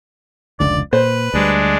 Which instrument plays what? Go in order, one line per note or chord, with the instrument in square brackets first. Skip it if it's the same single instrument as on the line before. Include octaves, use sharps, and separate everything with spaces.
[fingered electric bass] F1 C#2 D3 [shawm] D5
[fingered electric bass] A#2 [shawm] B4 [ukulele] C5
[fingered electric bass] D2 G3 [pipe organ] G#3 D4